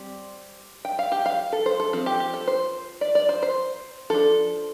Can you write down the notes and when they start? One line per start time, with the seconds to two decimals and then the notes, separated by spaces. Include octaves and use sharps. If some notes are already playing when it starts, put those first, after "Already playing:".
Already playing: G3 C4
0.85 G5
0.99 F5
1.12 G4
1.26 F5
1.52 A4
1.66 C5
1.80 A4
1.93 F3 C4 A4
2.06 G4
2.20 G4
2.34 A4
2.47 C5
3.01 D5
3.15 D5
3.29 C5
3.42 C5
4.10 F3 D4 A4